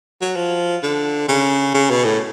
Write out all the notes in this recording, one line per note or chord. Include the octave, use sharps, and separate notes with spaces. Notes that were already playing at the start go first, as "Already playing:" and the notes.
F#3
F3
D3
C#3
C#3
B2
A2